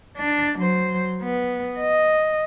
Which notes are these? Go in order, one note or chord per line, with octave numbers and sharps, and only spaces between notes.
D4
F#3 C5
B3
D#5